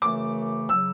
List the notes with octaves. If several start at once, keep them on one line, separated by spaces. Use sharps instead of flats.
F#2 C#3 E3 A3 D6
C#3 F#3 E6